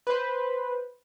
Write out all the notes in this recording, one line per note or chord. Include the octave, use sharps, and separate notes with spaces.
B4 C5